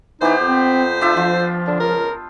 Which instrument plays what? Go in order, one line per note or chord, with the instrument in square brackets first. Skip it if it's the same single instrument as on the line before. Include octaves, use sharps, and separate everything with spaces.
[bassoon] E3 [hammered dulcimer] B3 G4 [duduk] D#4 [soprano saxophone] C5
[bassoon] F2 [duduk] C4
[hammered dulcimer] D4 E5 A5 [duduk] F4
[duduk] F3 [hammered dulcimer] F4
[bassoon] D3 [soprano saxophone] D4
[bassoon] C#2 [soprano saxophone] A#4